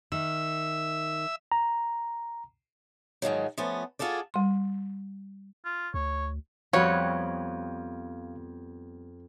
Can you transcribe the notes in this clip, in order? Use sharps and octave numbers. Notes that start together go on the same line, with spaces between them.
D#3 E5 E6
A#5
G#2 D#3 F3 F#3
F3 A3 B3 C#4
F4 F#4 G#4 A4 D5
G3 C6
F4
D2 C#5
F2 G3 B3 F#4 C#5 F5